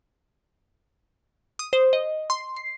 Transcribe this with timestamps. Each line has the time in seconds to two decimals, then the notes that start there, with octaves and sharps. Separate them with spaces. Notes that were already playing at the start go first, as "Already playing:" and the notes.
1.59 D#6
1.73 C5
1.93 D#5
2.30 C6
2.56 C7